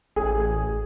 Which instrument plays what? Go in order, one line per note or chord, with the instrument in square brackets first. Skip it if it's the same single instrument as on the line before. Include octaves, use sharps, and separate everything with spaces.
[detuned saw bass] A1 [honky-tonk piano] G#4